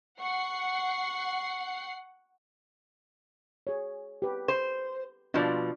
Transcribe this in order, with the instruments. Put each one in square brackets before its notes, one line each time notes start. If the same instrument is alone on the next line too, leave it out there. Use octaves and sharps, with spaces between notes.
[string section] F#5 C7 [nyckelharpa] C#6
[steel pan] G#4 C#5
G4 B4
[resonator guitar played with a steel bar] C5
[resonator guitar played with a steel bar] B2 F3 [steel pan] D4 F4 D5